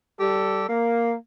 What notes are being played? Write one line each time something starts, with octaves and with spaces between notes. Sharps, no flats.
G3 G4 A4
A#3